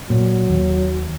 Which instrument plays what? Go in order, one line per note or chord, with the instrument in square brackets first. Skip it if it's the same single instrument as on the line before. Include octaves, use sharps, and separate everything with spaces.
[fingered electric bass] A#2 [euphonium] F#3
[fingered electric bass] D#2